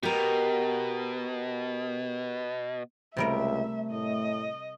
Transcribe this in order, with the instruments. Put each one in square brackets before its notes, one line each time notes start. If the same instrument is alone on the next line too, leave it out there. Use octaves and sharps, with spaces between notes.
[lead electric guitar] B2 [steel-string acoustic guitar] G4 A#4
[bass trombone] C#2 [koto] C3 G3 A#4 [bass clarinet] A3 [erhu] E5
[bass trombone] A2 [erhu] D#5